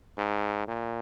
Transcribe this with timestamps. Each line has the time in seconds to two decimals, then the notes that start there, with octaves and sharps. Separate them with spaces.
0.18 G#2
0.68 A#2